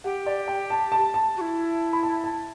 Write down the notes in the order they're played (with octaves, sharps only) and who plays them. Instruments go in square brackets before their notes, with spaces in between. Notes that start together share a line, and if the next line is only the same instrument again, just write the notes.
[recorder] G4 [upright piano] F#5
[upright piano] D5
G5
A5
A5
A5
[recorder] F#4
E4
[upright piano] B5
A5
A5